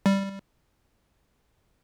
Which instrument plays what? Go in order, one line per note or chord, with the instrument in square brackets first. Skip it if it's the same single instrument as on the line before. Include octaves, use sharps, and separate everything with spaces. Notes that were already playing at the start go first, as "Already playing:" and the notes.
[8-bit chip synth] G3